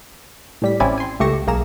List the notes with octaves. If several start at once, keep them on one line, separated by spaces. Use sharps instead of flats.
A2 G3 B6
A1 C4 C#4 E4 D5 G#5
G#5 C6
C#2 A3 G4 C#6 A#6 E7
B1 A#3 G#4 A#5 E7